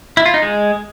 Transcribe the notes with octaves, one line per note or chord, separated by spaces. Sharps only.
E4
F4
D#4
G#3